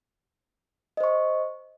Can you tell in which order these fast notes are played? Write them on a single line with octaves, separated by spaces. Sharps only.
D#5 C5 C#6